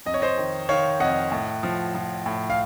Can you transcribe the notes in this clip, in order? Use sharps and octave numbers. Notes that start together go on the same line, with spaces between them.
F2 D#5
C#5
C5 D#5
D#3
D#3 C#5 F5
F2 D#5 F#5
A2
F3
F3
A2
F5